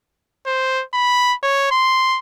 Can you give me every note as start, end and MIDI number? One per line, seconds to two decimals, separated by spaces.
0.46 0.83 72
0.94 1.34 83
1.43 1.71 73
1.71 2.19 84